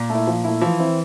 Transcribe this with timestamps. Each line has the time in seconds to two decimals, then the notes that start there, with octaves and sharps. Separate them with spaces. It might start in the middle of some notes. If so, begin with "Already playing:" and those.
Already playing: A#2
0.10 A3 E4
0.27 F3
0.44 A3 E4
0.61 E3 F3
0.79 C4 E4